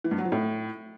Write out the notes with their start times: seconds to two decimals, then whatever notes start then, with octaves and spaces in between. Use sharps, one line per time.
0.04 E3
0.11 G2
0.18 F#3
0.25 F3
0.32 A2